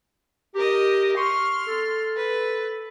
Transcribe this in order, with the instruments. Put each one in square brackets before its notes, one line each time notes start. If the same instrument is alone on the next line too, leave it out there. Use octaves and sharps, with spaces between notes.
[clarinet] G4 [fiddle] A#4 D#5
[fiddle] C6 F6 [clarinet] C#6
[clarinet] A4
[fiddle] B4